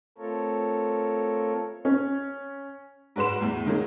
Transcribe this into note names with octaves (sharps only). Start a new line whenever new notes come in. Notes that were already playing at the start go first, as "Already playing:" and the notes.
A3 C4 F4 A4 A#4 C#5
C#4
G#2 F#4 B4 C6 E7
E2 A2
D#3 F#3 G#3 A#3